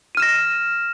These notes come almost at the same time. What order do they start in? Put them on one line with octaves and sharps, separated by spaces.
D#7 F6 E7 A#6